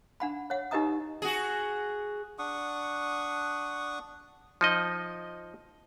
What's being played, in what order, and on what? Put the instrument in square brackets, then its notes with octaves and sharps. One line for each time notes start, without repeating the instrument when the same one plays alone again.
[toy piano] D4 F#5 B5
C#5 F#5
D#4 G4 B4 D#5 A#5 D#6
[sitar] F#4 G#4
[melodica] D4 F#5 C#6 D#6
[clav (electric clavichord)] F3 D#4 D#5